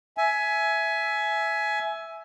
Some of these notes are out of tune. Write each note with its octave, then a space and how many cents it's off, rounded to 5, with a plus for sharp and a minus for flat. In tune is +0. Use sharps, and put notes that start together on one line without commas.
E5 +0 G#5 +20